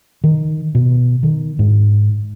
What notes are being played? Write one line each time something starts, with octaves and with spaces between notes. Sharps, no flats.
D#3
B2
D#3
G#2